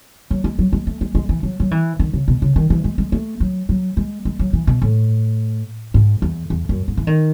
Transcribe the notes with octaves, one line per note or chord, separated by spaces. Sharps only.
F#3
G#3
F#3
G#3
A3
G#3
G#3
E3
F#3
F#3
E3
D#3
C#3
B2
C#3
D#3
E3
G#3
G#3
A3
F#3
F#3
G#3
G#3
F#3
E3
B2
A2
G#2
E2
E2
F#2
G#2
E3
D#3